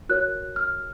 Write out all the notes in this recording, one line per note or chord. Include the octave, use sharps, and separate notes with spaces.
F#4 A#4 C#5 F#6
F6